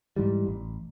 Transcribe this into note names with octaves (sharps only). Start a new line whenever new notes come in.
G#2 E3 G3
A1